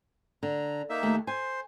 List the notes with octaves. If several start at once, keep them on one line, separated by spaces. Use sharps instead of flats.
D3 A#5
A#3 D#4 E5
D#2 A3 G4
C5 G#5